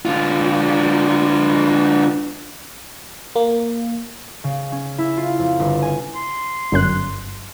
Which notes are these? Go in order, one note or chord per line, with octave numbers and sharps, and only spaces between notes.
D3 F4
A#3
C#3
C#4
E4
F4
F2
G1
G#5
C6
G1 F#2 F#6